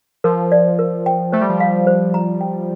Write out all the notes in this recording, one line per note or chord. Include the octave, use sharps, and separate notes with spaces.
F3 A#4
D5
A#4
G5
A3 C5
G3
F3
G3 F5
C5
A#5
G5